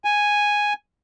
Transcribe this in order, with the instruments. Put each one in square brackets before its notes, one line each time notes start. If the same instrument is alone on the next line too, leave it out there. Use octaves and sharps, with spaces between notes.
[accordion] G#5